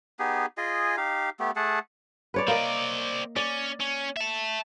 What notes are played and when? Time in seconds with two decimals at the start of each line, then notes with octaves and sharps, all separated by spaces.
0.19 B3 D#4 G4 G#4
0.58 F4 G#4 D#5 G#5
0.97 D#4 G4 F5
1.40 A3 B3 G4
1.56 A3 G#4 F#5 A5
2.34 B4 C#5 D5
2.48 A#3 C4 D5 D#5
3.36 C#4 D5
3.80 C#4
4.17 E5 A5